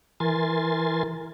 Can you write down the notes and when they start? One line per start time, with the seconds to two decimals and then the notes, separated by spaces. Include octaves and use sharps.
0.20 E3 A#4 G#5 C6 A6